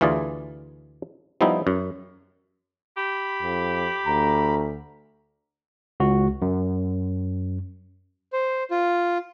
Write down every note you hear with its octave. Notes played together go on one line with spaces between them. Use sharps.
D2 E3 F4 G#4 D5
F3 G3 B3 D#4 E4
F#2
G4 B5
F2
D2 A#5
C#2 F#4
F#2
C5
F4